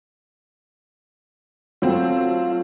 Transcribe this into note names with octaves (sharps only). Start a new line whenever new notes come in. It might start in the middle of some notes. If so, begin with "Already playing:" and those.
F#3 A3 C4 F4